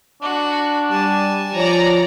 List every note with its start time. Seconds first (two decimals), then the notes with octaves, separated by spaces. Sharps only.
0.22 D4 F#4
0.92 G3 G#5 A5
1.55 F3 C#5 D5 A#5